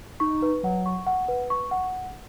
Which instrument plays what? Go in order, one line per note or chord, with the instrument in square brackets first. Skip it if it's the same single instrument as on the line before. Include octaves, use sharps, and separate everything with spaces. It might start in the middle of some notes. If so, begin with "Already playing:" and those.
[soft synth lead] D#4 [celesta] C#6
[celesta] B4
[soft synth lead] F#3 [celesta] F#5
[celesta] C#6
F#5
B4
C#6
F#5